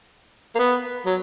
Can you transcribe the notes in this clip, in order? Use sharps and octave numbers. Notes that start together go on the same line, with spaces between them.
A#3
B3
F#3